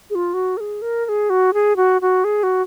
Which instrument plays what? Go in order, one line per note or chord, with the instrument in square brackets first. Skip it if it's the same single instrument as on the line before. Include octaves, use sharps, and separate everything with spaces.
[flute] G#4
F4
F#4
A#4
G#4
A#4
A#4
G#4
F#4
G#4
F#4
F#4
G#4
F#4